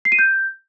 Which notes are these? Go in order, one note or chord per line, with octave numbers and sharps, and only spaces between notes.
C7
D#7
G6